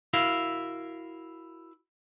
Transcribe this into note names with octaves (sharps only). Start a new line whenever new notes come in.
E4 F#4 A#4 F5